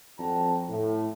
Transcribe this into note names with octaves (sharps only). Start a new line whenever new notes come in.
F2 D4 F#4 G5 A5 A#5
A2